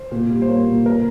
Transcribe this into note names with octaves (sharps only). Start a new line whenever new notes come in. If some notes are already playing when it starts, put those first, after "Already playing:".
Already playing: C5
A#2
G3
C5
A#3 C#5
A#2
A#2 A#4